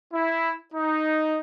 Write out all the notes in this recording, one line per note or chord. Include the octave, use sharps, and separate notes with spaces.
E4
D#4